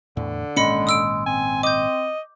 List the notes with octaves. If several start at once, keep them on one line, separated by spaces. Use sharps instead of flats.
E2 A2 D3
G#1 A#2 G#3 C#4 D#5 B5 C#7
D#6 E6 D7
C4 G#5
D#5 D6 G6